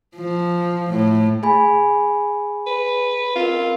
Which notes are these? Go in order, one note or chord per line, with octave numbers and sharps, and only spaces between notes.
F3
A2
G#4 G#5 B5
B4
C4 F4 A#4